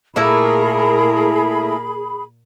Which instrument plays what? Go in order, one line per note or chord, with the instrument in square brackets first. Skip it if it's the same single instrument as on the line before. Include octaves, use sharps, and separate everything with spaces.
[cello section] A#2 A#4 [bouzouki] A3 A#3 E4 [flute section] G#4 B5